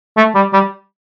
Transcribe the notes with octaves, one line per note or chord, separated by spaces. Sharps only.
A3
G3
G3